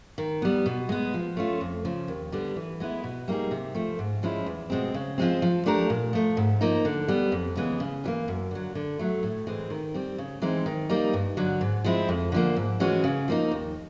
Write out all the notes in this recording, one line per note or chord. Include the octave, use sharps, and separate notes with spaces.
D#3
G3 B3
B2
G#3 B3
F3
A3 C#4 F4
F2
C#3 F3
D#2
D3 G3 B3
E3
G#3 B3 E4
B2
G3 A#3 D#4 G#4
C3
F3 A3
G#2
F3 G#3 C#4 E4
E2
B2 G#3 C4
C#3
F3 G#3 C4
F3
A3 D4 G4 A#4
A#2
F3 A3
G#2
F3 A#3 D#4
D3
G3 B3
F2
C#3 E3 G#3 B3
C#3
E3 G3 A#3
F#2
D3 F#3
D3
F#3 A3
A2
E3 G#3 C4
D#3
G3 C4
C#3
E3 G#3 C4 D#4
D#3
G3 A#3 D#4
G2
D3 F#3
G#2
F3 G#3 C4 E4
F2
D3 F3 A#3
G#2
E3 G#3 C#4 F#4
C#3
F3 A#3 D#4
D#2